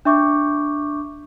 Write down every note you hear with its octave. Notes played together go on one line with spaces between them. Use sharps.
D4 E5 C#6 D6 G6